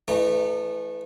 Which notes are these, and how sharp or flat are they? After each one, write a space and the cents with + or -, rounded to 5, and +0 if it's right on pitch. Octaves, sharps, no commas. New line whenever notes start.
E3 +25 A3 -10 D#4 -40